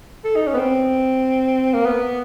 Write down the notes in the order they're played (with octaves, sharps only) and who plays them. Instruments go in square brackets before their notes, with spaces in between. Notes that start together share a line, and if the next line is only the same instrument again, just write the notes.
[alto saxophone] A4
D#4
C#4
B3
C4
A#3
B3